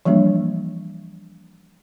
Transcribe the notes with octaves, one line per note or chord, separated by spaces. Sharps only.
E3 F3 G3 A#3 D4